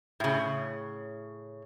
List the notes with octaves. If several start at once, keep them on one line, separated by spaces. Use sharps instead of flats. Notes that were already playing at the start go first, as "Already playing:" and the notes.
A2 C#3